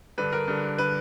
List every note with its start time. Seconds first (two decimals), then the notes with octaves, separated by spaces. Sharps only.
0.18 G2 D3 B4
0.33 A#4
0.48 G2 D3
0.78 D3 B4